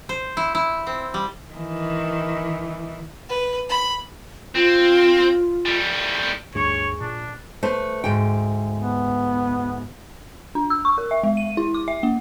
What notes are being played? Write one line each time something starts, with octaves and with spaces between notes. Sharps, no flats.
C5
E4
E4
C4
G3
D#3 E3
B4
B5
C4 F4
G3 A3
D2 G2 G#4 C#5 C#6
A#2 D4
A3 B4 C5
D2 G#2 G5
B3
D4
E6
C#6
A#4
E5
G#3
D#7
E4
D6
E5
A#3